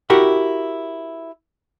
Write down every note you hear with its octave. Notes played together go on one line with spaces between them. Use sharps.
E4 F#4 G4 A#4 E5 F#5